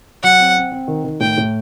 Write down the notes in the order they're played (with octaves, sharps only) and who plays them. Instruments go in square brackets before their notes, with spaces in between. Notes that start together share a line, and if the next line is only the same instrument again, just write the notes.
[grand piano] F#3 [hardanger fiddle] F#5
[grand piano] C4
C4
C4
D#3
D#3
[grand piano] A2 [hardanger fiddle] G5
[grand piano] A2